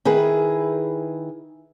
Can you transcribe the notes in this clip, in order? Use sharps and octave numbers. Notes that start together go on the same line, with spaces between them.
D#3 E4 G#4 B4